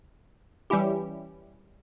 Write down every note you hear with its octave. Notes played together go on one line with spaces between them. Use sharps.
E3 G3 C#4 E4 G4